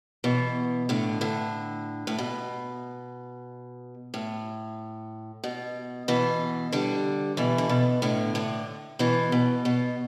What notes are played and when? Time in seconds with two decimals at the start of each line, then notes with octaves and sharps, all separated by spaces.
0.24 B2 E3
0.89 A2 D3
1.21 A2 D3
2.07 A2
2.18 B2
4.14 A2
5.44 B2
6.08 B2 E3
6.72 D3 G3
7.37 B2 E3
7.58 D3
7.69 B2
8.02 A2 D3
8.35 A2 D3
8.99 B2 E3
9.32 B2
9.65 B2